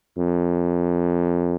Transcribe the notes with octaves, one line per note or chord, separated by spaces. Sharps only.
F2